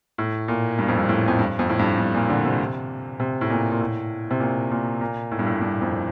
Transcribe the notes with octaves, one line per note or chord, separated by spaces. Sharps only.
A2
A#2
G2
F2
G2
A2
F2
G2
F2
A2
G2
G2
A#2
D3
C3
C3
A2
A#2
A#2
A2
C3
A#2
A#2
A#2
A2
G2
A2
G2
F2